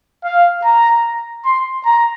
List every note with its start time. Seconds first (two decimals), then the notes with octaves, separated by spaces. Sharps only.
0.24 F5
0.64 A#5
1.45 C6
1.85 A#5